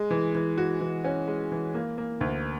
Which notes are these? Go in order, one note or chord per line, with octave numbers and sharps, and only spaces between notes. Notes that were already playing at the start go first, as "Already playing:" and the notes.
Already playing: G#3
E3
E3
F#4
E3
C#4
G#3
E3
A#3
A#3
D2